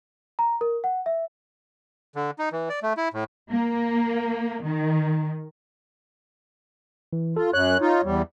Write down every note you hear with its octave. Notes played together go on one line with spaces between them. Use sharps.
A#5
A#4
F#5
E5
D3
D#4
E3
D5
A3
E4
A2
A#3
D#3
E3
F4 A4
F#2 C#5 F#6
D#4 F4
E2 G3